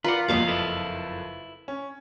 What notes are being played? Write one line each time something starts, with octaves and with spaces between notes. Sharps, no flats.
F4 A#4 B4 D5 F#5
F#1 F2 G3 A#3 B3 D#5 F5 D6
E4 A4 B4
C#4